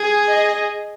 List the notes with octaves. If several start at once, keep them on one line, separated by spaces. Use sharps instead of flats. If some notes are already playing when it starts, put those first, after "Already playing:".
Already playing: G#4
D#5